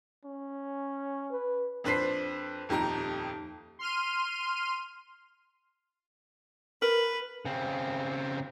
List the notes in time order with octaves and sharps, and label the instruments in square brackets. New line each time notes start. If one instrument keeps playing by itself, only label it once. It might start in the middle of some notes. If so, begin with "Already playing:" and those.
[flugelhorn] C#4
[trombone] B4
[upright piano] F2 D4 B4 C5 B6 C7
D#1 F2 D#4 G4 A#5
[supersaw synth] C6 F6 D#7
[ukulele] A#4 [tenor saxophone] B4
[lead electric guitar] C#3 C4